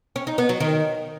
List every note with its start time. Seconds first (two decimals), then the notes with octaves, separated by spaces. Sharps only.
0.16 C#4
0.27 D#4
0.38 B3
0.49 F#3
0.60 D#3